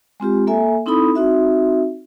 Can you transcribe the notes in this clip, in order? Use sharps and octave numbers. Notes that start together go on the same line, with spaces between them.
G#3 C4 F4 G4
A#3 A4 E5 G#5
C4 D#4 E4 A4 B5 D#6
C4 D#4 F#4 E5